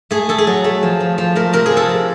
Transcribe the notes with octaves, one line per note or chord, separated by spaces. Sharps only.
A3 G#4
A3 A4
G#4
F#3
A3
F3
F3
F3
A3 A#4
C3 A#4
G#4
F3
A4
C3